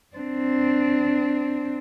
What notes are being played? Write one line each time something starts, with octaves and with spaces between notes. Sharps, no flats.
C4 D4